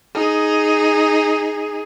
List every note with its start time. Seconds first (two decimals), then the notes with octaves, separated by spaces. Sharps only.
0.15 D#4 G#4